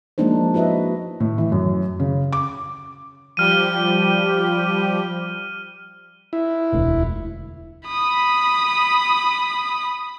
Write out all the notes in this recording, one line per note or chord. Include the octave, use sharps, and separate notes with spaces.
F3 G#3 A#3 D4 D#4 C5
E4 F#4 B4 D#5 E5
A2
E3
F#2
C#3
D6
F3 G3 G4 F6 D#7
E4
E1 D2 B2
B5 D#6